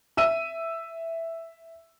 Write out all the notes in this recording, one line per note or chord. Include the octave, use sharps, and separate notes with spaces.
E5 E6 D#7